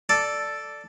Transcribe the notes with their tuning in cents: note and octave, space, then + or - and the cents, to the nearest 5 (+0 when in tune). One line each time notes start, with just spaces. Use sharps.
A4 +0 D5 +0